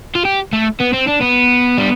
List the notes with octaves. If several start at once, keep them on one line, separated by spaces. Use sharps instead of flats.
F4
G4
A3
B3
C4
D4
B3
G3